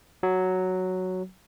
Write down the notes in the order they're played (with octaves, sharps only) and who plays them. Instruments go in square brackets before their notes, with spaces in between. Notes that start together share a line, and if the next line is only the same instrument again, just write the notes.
[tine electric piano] F#3